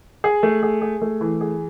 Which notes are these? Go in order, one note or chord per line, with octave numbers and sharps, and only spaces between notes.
G#4
A3
G#4
G#4
A3
E3
G#4